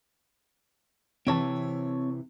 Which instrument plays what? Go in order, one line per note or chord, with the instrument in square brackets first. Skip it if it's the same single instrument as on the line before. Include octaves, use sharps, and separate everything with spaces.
[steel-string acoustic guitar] C3 E3 [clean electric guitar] C4 C#5 A5